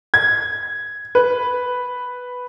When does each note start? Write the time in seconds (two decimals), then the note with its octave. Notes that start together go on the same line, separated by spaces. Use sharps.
0.14 G#6
1.15 B4